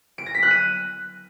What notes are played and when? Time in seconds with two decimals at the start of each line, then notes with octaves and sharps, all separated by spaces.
0.18 D7
0.26 A#6
0.34 B6
0.43 F#6
0.51 D#7